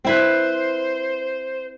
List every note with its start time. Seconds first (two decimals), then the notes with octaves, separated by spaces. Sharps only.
0.05 C4 E4 B4 C5